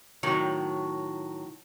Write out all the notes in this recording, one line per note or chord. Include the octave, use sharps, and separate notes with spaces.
A2 D#3 F#3